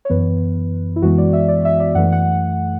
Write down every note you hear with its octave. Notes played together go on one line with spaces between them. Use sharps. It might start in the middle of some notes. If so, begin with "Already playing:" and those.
C#5
F#2 E3 B3 B4
E4
F#2 E3 G#3 B3 F#4
D5
E5
D5
E5
D5
F#2 E3 A3 F#5
F#5